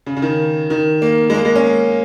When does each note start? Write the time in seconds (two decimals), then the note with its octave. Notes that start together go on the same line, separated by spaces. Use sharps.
0.06 C#3
0.17 C#3
0.22 D#3
0.70 D#3
1.02 A#3
1.30 G#3
1.34 A#3
1.45 G#3
1.55 C#4